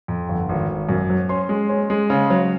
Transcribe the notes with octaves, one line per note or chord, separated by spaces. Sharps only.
F2
G1
G#1
G#1
F#2
F#3
C#4 C6
G#3
C#4
G#3
C#3
F#3